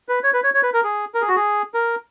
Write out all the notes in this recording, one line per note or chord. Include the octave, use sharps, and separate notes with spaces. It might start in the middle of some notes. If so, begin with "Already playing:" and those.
B4
C#5
B4
C#5
C#5
B4
A#4
G#4
A#4
G#4
F#4
G#4
A#4